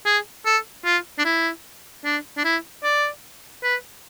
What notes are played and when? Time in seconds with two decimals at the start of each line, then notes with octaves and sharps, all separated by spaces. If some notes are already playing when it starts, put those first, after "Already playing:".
0.06 G#4
0.46 A4
0.85 F4
1.19 D4
1.25 E4
2.05 D4
2.37 D4
2.44 E4
2.84 D5
3.63 B4